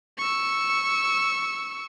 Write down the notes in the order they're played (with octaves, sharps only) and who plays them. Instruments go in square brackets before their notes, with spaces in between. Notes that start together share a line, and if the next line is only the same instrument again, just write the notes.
[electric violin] C#6 E6